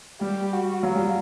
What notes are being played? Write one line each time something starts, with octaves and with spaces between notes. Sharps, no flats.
G3 G4
F#4
F#3 F4
G3